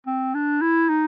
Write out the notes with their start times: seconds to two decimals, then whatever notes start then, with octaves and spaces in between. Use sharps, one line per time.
0.07 C4
0.35 D4
0.61 E4
0.89 D#4